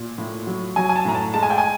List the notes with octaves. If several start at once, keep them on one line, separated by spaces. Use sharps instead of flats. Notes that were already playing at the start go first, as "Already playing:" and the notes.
Already playing: A#2
A2
F#3
F#3 G#5
G#5
A5
A2 A#5
A5
G#3 A5
G#5
G5
G#5